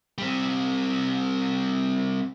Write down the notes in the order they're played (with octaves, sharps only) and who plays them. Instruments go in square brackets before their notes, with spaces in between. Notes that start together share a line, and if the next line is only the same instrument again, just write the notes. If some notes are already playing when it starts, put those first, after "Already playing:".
[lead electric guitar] G3 C4